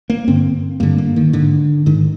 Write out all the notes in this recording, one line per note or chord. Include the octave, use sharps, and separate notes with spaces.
A#3
G2 D3 C4
G2 D3 A#3
A#3
D#3
G#2 D3
G#2 D#3